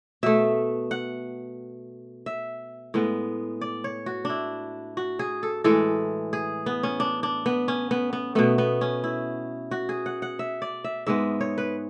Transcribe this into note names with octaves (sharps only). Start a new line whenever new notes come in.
B2 A3 E5
F#5
E5
A2 G#3 B3
D5
C#5
F#4
D4 E4
F#4
G#4
A4
A2 E3 G#3 A4
G#4
B3
C#4
D4
D4
B3
C#4
B3
B3
B2 A3 B3
B3
C#4
E4
F#4
G#4
F#5
F#5
E5
D5
E5
G#2 G#3 B3 E5
C#5
B4